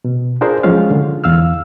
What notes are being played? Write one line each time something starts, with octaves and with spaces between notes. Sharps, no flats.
B2
D4 F4 G#4 A#4 C5 D5
F3 F#3 G#3 C#4 F4 F5
D3
E2 F5 E6 F6